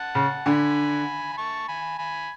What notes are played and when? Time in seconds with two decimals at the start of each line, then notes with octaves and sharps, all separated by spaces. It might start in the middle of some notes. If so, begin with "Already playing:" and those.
Already playing: F#5 A5
0.15 C#3
0.46 D3 G#5 B5
1.32 B5
1.37 A5 C#6
1.68 G#5 B5
1.98 G#5 B5